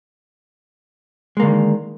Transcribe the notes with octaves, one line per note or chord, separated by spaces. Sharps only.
D3 D#3 G#3 A#3